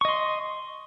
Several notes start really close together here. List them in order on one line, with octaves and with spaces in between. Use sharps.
C#6 D#5 C6